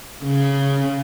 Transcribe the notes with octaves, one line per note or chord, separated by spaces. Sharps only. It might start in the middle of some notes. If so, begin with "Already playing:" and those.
C#3